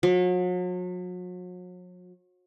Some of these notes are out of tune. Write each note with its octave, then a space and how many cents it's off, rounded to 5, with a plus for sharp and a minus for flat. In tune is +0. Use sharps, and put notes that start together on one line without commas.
F#3 -40